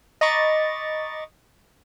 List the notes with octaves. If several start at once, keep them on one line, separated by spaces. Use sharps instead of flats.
D#5 A#5 B5 C#6 D6 A6